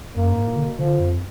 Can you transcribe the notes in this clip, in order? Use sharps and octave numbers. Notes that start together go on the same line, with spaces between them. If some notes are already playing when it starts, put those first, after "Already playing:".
F#2 A#3
G#2
A#2
D3
B2
D3 F3
F2